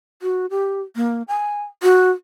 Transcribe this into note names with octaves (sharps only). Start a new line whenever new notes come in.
F#4
G4
A#3
G#5
F#4